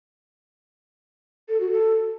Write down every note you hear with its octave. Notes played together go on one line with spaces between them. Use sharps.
A4
F#4
A4